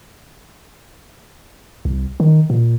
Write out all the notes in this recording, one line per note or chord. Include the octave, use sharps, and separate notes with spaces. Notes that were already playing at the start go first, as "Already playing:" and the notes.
C2
D#3
A#2